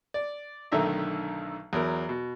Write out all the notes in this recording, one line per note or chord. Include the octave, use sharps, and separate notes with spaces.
D5
B1 D3 D#3 A3 E5 A#5
E2 F#3 A#4
B2